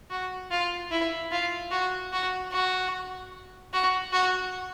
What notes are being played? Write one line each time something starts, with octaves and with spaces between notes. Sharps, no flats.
F#4
F4
E4
F4
F#4
F#4
F#4
F#4
F#4